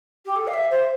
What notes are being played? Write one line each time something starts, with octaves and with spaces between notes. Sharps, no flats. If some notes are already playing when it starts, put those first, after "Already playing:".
G4
A4
F5
E5
C5